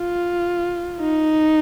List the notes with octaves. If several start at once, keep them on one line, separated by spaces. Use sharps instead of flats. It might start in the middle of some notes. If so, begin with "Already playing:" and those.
Already playing: F4
D#4